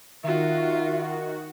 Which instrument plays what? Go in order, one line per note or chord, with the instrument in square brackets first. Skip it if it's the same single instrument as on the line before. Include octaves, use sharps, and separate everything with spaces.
[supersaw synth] D#3 F#4 [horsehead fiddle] F4 [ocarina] E5